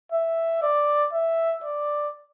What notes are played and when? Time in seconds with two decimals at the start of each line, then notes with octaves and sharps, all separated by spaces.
0.12 E5
0.62 D5
1.13 E5
1.64 D5